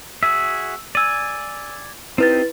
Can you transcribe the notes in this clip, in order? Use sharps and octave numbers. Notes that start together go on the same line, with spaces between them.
F#4 G#4 E5 E6
D5 G#5 E6 D#7
C4 D#4 E4 G4 B4 A6